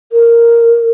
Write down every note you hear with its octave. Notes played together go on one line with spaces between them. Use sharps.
A#4